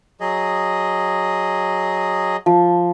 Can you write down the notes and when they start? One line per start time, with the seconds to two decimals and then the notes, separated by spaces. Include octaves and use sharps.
0.20 F#3 G#4 D#5
2.46 F3